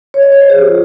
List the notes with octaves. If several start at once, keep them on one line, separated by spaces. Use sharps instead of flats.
C#5
D#5
C#5
C5
G2 F3 G#4
G4
F4